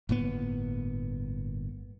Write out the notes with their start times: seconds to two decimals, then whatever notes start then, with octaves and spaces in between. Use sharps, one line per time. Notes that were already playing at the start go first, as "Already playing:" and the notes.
0.09 G1 A2 A#3 B3